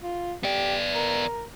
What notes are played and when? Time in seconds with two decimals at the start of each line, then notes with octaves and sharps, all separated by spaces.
0.03 F4
0.43 B3 G4 D5
0.94 A#4